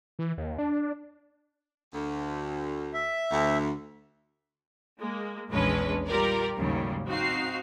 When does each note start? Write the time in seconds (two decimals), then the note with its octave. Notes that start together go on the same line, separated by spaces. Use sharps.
0.19 E3
0.38 D#2
0.58 D4
1.93 D2
2.94 E5
3.31 D2
4.99 G#3 A#3
5.50 A#1 E2 G#3 C#4 D4 B4
6.07 G3 F4 G4 A#4 D5
6.57 A1 D#2 G#2 C#3 F#3 G3
7.07 C4 D#4 F#4 F5 C7